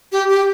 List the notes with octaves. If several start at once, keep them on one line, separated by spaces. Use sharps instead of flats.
G4
G4